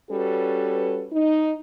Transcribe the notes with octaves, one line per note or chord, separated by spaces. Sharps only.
G3 C#4 F#4 A4 B4
D#4